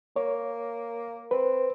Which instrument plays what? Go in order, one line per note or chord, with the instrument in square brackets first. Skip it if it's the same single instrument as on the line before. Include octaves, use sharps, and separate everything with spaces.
[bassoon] A#3 [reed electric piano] C#5
[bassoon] C4 [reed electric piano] B4